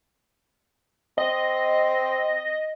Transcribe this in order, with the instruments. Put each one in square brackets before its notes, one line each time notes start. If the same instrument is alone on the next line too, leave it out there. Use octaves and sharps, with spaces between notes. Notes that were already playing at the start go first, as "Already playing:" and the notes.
[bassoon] C4 [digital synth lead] D#5